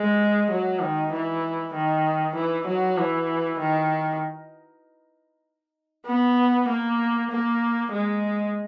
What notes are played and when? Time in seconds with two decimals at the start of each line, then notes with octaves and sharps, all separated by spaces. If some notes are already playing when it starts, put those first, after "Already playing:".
Already playing: G#3
0.51 F#3
0.81 D#3
1.13 E3
1.74 D#3
2.36 E3
2.67 F#3
2.98 E3
3.60 D#3
6.07 B3
6.69 A#3
7.31 A#3
7.93 G#3